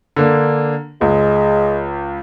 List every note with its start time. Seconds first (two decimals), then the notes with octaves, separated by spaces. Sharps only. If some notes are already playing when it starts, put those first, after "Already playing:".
0.16 D3 A#3 D4
1.01 C#2 G#3